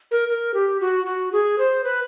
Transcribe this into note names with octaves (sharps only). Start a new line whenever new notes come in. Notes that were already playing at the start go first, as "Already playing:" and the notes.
A#4
A#4
G4
F#4
F#4
G#4
C5
B4